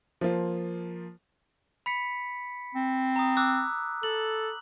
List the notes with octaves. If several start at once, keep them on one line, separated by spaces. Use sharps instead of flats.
F3 A#3 F4
B5 B6 C#7
C4
A#5 D#6
D6 E6 F#6
A4 F#7